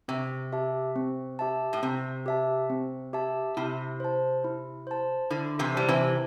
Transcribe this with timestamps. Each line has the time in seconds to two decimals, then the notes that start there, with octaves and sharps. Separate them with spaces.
0.08 C3 C4
0.53 G4 E5 A5
0.96 C4
1.39 G4 E5 A5
1.73 A2
1.83 C3 C4
2.26 G4 E5 A5
2.70 C4
3.13 G4 E5 A5
3.57 C3 E4
4.00 C5 A5
4.44 E4
4.87 C5 A5
5.31 D3 E4
5.59 C3 E3
5.75 G3 C5 A5
5.88 C3 E3